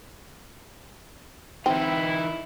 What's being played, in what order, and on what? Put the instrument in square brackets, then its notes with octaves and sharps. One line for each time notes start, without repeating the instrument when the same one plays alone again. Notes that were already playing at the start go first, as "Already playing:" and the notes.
[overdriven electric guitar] E3 D#4 [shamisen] C4 [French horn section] E4